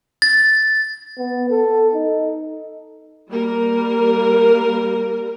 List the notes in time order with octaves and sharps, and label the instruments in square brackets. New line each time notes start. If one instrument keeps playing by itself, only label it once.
[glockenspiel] A6
[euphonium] B3
A4
D#4
[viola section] G3 A#3 A#4